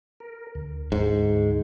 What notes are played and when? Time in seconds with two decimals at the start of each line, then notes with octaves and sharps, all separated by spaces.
0.20 A#4
0.55 D2
0.92 G#2